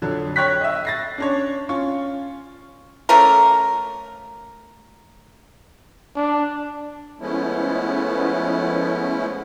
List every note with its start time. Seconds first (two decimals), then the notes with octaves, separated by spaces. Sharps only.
0.02 F2 D3 F#3
0.36 C#5 G5 C#6 F#6 A#6 B6
0.61 D#5 E5
0.85 A6 A#6 C7
1.18 C#4 D4 C#5
1.69 C#4 F4 C#6
3.09 A3 A#3 C#4 A#4
6.16 D4
7.20 F3 G#3 A3 B3 C#4 E4